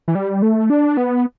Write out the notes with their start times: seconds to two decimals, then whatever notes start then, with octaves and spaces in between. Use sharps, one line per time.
0.08 E3
0.15 G3
0.42 A3
0.70 D4
0.97 B3